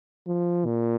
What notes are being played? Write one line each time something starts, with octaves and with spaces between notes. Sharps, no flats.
F3
A#2